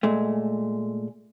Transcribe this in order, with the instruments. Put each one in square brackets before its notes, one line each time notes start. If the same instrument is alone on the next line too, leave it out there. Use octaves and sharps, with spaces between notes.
[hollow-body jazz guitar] A#2 G#3 A3